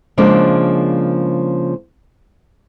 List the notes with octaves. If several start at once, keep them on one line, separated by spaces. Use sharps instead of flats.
C#3 F3 G#3 A#3 D4